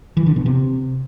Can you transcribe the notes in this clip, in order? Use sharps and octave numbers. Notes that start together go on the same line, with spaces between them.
E3
D3
B2
C3